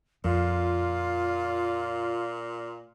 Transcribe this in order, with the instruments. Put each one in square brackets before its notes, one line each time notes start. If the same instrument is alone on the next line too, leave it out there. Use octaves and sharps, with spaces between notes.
[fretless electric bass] F2 [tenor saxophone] A#2 [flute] F4